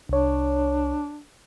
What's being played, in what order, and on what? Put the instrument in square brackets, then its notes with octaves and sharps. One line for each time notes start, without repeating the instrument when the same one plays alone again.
[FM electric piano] C2 C#5 [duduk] D4